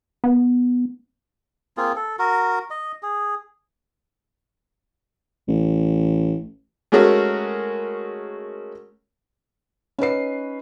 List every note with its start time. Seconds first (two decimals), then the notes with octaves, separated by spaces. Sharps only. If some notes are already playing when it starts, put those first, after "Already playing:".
0.24 B3
1.77 A#3 C4 F4 G#4
1.96 A4
2.19 F#4 A#4
2.70 D#5
3.03 G#4
5.48 A1
6.92 G#3 A3 C#4 F#4 G#4 A#4
9.98 C#4 D#4 B4 C7